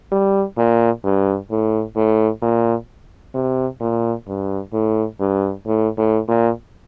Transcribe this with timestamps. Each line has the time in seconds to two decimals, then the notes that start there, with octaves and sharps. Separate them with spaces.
0.12 G3
0.58 A#2
1.04 G2
1.51 A2
1.96 A2
2.42 A#2
3.34 C3
3.81 A#2
4.27 G2
4.73 A2
5.20 G2
5.67 A2
5.98 A2
6.28 A#2